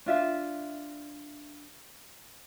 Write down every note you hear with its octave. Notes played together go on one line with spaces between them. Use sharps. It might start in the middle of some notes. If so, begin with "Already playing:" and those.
D4 F4 E5